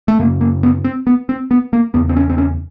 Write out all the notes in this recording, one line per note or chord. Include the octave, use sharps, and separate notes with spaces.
A3
F#2 C#3 A#3
A#3
B3
C4
B3
C4
B3
A#3
E2 C#3 B3
C4
C#4
C4
C#4